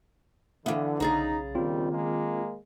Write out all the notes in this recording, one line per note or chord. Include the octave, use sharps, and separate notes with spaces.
D3 E3 B3 E5 F5
B1 C#3 D#4 G#4 A#5 A6
A#1 D#2 D#3 G3 C4 F4
G#3 A#3